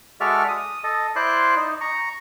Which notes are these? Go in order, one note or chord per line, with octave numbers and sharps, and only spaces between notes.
G#3 F#4 A4 D5 E5 F6
D#6
A4 D#5
E4 C5 D5 C6 F#6
D#4
A#5 C#6